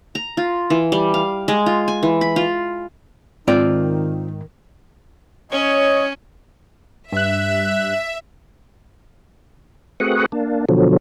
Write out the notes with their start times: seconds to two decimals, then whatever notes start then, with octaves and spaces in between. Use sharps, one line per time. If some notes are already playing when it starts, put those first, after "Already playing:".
0.15 A#5
0.37 F4
0.70 E3
0.92 G3
1.14 F5
1.48 G#3
1.66 F4
1.88 G#5
2.03 E3
2.21 B5
2.36 F4
3.48 G#2 D#3 C4 F4 D5
5.52 C#4 C#5 D#5
7.12 G2 E5 F#6
10.00 A3 C4 F#4 G#4 B4 F#5
10.32 A#3 D4
10.69 B2 D3 F3 F#3